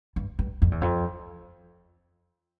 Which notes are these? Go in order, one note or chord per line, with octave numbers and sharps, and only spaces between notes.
G2
G2
F2
E2
F2